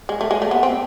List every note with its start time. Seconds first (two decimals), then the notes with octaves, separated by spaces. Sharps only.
0.09 G#3
0.21 A3
0.31 G#3
0.42 A3
0.51 B3
0.63 C4